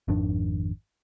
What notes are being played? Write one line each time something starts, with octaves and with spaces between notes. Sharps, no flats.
G#1 F2 D#3 D4